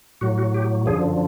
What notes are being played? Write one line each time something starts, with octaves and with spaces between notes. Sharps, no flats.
A2 F#3 F#4
F#4
G4
F#2 D3 F3 G#4